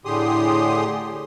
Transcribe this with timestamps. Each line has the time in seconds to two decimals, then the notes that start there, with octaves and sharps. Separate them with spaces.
0.05 A2 D3 G4 G#4 C6 D#6